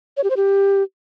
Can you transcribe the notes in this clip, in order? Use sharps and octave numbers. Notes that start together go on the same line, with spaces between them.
C#5
G4
C5
G4